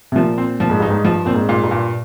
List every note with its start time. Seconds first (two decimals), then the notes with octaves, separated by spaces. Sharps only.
0.12 C3
0.16 A#2 F3
0.38 C4
0.60 A#2 F3
0.70 G#2
0.80 G2 D#4
0.90 G#2
1.05 G2 F3
1.26 A#2 C4
1.35 G#2
1.49 A#2
1.64 G2
1.71 A#2